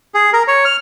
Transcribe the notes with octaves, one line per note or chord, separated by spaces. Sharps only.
G#4
A#4
C#5
F6